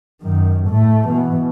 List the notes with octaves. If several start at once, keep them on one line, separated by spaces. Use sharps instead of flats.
F#2 D#3
A2 A3
B2 E3